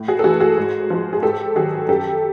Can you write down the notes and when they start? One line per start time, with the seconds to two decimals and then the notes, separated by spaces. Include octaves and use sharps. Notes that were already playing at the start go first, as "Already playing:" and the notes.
Already playing: A2
0.08 F#4 G#4
0.19 A4
0.24 E3 F#4 G#4
0.28 G#3
0.40 F#4 G#4
0.57 G#2
0.90 F3 G#3
1.13 G#4
1.22 G#2 G4 A4
1.55 D#3 F#3 F#4 G#4
1.88 F#2 G4 A4